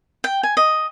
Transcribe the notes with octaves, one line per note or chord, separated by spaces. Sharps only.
G5
G#5
D#5